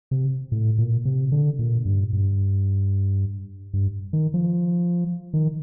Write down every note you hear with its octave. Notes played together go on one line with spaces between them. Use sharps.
C3
A2
A#2
C3
D3
A#2
G2
G2
G2
D#3
F3
D#3